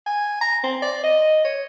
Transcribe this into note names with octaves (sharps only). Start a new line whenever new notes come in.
G#5
A#5
C4
D5
D#5
C#5